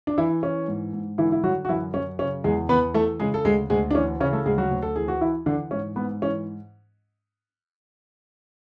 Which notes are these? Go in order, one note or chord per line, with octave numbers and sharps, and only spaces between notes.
D4
E3 E4
E3 C#4
G#2
G#2
D3 E3 E4
E4
D3 F#3 F#4
F#4
F#2 E3 E4
F#2 C#4
C#3 C#4
E2 G#3 G#4
E2 B3 B4
E3 A3 A4
C#3 G#3 G#4
A4
D2 G#3 G#4
D2 G#3 G#4
D4
E3 C#4
C#3 C#4
A3 A4
D2 G#3 G#4
F#3 F#4
D2
A4
E3 G#4
F#4
E3 E4
D3 E3 D4
G#2 C#4
G#2 B3
E3 C#4